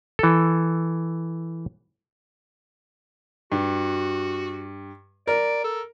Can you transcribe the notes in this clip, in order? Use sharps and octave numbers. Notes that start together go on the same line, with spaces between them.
E3 A4
G2 F#4
A#4 D5
A4